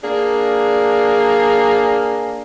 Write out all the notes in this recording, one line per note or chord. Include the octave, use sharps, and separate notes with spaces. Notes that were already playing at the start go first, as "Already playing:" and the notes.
A#3 D4 G#4